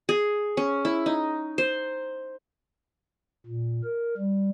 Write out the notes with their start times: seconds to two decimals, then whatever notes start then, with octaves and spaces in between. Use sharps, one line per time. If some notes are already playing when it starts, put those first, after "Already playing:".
0.09 G#4
0.57 C#4
0.85 E4
1.06 D#4
1.58 C5
3.46 A#2
3.84 A#4
4.17 G3